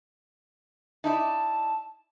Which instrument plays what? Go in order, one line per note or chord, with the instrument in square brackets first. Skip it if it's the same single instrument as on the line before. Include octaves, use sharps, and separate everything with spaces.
[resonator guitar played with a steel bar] D#4 E4 D5 [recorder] A5